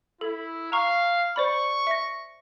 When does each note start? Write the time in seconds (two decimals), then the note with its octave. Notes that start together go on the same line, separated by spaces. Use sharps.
0.21 E4 A4
0.72 F5 A#5 C#6
1.36 C5 D5 B5 C#6
1.87 E5 A#6